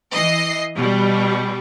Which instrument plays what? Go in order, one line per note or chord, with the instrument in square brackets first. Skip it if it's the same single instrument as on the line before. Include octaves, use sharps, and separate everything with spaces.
[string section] E3 D#5 C7
B2 G3